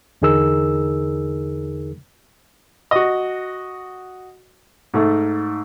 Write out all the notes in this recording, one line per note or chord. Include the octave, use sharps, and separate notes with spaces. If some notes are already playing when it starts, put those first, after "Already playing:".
E2 D3 D#4 G#4 A#4 E6
F#4 D#5
G#2 A3